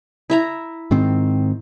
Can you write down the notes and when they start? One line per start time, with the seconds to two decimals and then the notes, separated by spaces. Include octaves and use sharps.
0.30 E4 E5 A#5
0.91 G#2 D#3 C4